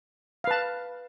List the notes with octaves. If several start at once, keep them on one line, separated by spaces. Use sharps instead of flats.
B4 F5 A5